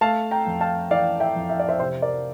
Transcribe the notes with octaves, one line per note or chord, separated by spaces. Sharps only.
A3 F5 A5
G5 A#5
F2
F5 A5
E3 D5 F5
E5 G5
F2
E5
D5
C5 E5
C3 C5 E5
A#4 D5